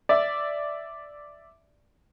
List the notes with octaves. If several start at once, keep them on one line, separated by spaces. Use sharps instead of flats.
D5 E5